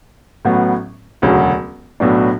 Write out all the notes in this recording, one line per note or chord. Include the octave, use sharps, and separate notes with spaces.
A1 A2 F#3 B3
E1 D2 C#3 F#3 C#4
B1 A2 F#3 B3 D4